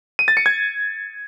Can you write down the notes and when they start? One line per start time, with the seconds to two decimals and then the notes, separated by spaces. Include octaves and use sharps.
0.19 D#7
0.28 A6
0.37 C#7
0.46 G#6